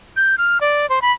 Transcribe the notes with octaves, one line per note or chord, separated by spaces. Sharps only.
G6
F6
D5
C5
B5